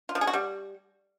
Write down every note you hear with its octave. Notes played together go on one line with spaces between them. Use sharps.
F4
F3
G#4
F#4
G3